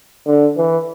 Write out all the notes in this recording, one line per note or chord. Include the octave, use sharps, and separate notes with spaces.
D3
E3